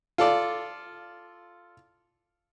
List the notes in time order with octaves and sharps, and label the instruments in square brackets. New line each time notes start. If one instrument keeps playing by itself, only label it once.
[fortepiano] F4 A4 D5